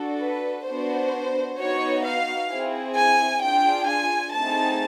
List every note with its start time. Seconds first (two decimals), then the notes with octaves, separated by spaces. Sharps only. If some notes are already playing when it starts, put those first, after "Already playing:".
Already playing: D4 F#4 A4
0.22 B4
0.67 B3 D4 F#4 C5
1.59 B3 D#4 F#4 C#5
2.06 F5
2.50 C4 E4 G#4
2.96 G#5
3.42 D4 F4 G#4 G5
3.88 G#5
4.33 A3 C4 D#4 G#4 A5